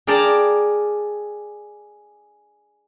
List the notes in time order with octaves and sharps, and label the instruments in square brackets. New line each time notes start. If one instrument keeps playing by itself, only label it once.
[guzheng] G#4 A#4 D5 G5 A5 A#5